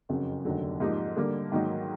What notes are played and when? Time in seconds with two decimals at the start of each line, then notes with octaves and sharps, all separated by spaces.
0.09 F#1 F2 C#3 F#3
0.45 F1 D#2 D3 F#3
0.80 G#2 F3 A#3 D#4 G4
1.16 D3 G3 A#3
1.52 G#2 D#3 F#3 A#3 D#4